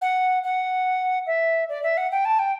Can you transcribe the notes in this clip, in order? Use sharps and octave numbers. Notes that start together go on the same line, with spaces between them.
F#5
F#5
E5
D5
E5
F#5
G5
A5
G5